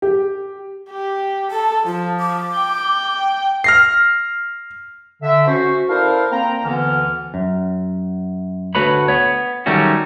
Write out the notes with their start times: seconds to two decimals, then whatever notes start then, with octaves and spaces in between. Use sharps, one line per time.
0.02 G4
0.90 G4
1.51 A4 A5
1.86 F3 F4
2.20 D6
2.55 G5
3.64 F6 A#6 C7
5.22 D3 E5
5.47 C#4 F#4 C5
5.89 E4 A4 A#4 C5 D5 F5
6.31 A#3 C4 G5 A#5
6.64 D2 D3 E3 B3 F6
7.34 F#2
8.75 D2 A3 F#4 B4 C#5 B5
9.08 B3 C#5
9.66 D#3 F#3 G3 A3 C#4 F#4